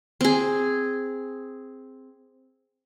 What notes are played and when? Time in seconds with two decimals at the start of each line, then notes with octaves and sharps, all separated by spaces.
0.21 C4 G#4